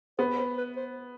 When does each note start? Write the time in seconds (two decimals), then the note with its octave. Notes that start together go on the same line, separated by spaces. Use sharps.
0.19 B3 C5
0.38 C5
0.58 B4
0.76 C5